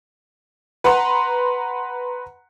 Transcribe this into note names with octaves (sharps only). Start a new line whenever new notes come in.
B4 F#5 A#5 C6